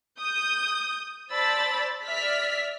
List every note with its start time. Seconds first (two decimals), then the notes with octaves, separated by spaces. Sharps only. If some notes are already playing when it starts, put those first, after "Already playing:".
0.19 D#6 G6
1.32 C5 D5 A5 B5 E6 A6
2.07 D5 E5 F6 B6